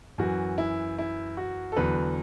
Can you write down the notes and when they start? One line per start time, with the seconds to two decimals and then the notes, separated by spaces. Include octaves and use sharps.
0.18 F#2 E3 F#4
0.58 E4
0.98 E4
1.37 F#4
1.72 A4
1.76 E2 D3 F#3 B4